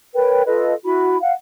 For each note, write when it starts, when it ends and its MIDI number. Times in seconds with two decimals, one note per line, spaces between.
0.14 0.42 70
0.14 0.42 71
0.14 0.42 73
0.14 0.42 79
0.46 0.72 65
0.46 0.72 69
0.46 0.72 71
0.46 0.72 75
0.84 1.16 64
0.84 1.16 66
0.84 1.16 83
1.20 1.32 77
1.20 1.32 78